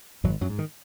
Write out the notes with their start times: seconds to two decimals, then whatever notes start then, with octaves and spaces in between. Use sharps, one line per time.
0.24 G#1 F#2 F#3
0.41 F#2 F#3
0.50 G#2
0.59 D#3